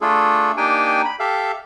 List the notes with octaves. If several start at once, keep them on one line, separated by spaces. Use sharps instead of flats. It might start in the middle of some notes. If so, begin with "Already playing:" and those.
A3 D4 F4 G#4 A4
A#3 D4 D#4 G4 G5 G#5
B5
G4 A4 E5 F5